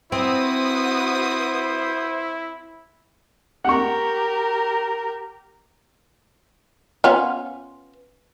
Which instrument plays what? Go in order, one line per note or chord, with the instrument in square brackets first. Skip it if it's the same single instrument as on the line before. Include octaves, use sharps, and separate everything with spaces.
[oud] C4 [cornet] E4 [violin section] F#4 B4 D#6 [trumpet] C5
[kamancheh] G4 A#4 [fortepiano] F#5 C#6
[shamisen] B3 C#4 F4